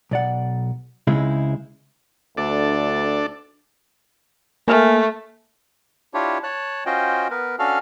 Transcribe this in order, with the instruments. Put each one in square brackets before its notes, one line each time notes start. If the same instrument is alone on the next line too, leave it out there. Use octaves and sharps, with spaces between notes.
[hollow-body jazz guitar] B1 D5 F#5
C#2 C#3 G#3 C4 D#4 E4
[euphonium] D2 [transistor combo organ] D4 A4 D5
[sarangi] A3 [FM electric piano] A#3 G#5 F6
[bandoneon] D4 E4 F4 G4 C#5
C#5 A5 F#6
C#4 F4 F#4 C5 D#5 G5
B3 A#4 B4
C#4 D4 F#4 A4 F5 F6